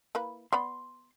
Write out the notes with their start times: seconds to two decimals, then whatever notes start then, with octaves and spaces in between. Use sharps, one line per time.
0.15 A#3 E4 B4
0.53 B3 D5 B5 C6